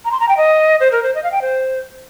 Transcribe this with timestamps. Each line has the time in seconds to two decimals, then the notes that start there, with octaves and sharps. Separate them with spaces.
0.05 A#5
0.12 C6
0.20 A#5
0.29 G5
0.37 D#5
0.80 C5
0.92 A#4
1.03 C5
1.15 D#5
1.24 F5
1.32 G5
1.42 C5